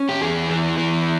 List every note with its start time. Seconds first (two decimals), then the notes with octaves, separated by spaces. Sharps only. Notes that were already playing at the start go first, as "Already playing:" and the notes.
Already playing: C#4
0.09 G4
0.21 E2 G#4
0.50 E3
0.77 E3